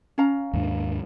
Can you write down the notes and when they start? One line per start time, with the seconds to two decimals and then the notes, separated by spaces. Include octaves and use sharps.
0.18 C#4 F5 A#5
0.53 D#2 G#2 D4